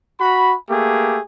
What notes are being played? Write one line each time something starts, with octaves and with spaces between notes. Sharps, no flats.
F#4 B5
A3 A#3 G4 G#4